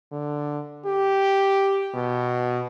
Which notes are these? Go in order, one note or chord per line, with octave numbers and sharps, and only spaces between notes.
D3
G4
B2